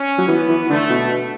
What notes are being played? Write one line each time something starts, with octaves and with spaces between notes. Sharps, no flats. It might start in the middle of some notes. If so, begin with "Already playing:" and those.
Already playing: C#4
F#3
E3 B3
E3
D3 A3
B2